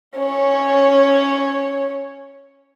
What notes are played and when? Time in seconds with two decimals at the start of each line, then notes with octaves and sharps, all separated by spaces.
0.17 C#4 C#5